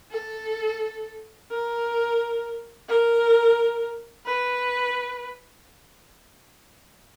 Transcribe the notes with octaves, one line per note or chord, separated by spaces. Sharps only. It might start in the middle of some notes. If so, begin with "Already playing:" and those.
A4
A#4
A#4
B4